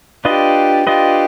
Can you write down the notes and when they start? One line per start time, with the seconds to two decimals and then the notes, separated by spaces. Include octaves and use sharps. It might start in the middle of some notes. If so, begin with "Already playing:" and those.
0.25 D4 F4 G4 B4 D#5
0.87 D4 F4 G4 B4 D#5